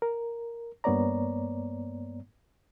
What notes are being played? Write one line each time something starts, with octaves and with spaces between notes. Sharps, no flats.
A#4
G2 A#3 B3 C#5 D5 A#5